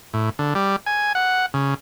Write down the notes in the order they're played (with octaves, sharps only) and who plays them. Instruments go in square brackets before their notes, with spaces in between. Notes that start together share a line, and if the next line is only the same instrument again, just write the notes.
[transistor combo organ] A2
D3
G3
G#5
F#5
C#3